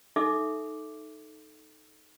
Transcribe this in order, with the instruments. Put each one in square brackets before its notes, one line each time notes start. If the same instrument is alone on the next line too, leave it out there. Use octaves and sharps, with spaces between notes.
[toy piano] D#4 A4 E5 D6